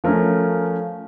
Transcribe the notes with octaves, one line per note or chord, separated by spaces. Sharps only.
F3 A3 C#4 A#4